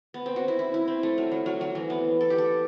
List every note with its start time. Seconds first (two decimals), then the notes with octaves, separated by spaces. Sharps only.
0.14 B3
0.26 C4
0.36 F#4
0.48 E4
0.59 E4
0.74 E4
0.88 C4
1.03 A3
1.18 F#3
1.32 F#3
1.46 F#3
1.61 F#3
1.75 E3
1.90 B3
2.21 A4
2.30 G4
2.38 A4